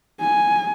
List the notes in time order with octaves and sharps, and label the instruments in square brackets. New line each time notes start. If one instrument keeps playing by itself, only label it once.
[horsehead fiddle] G#5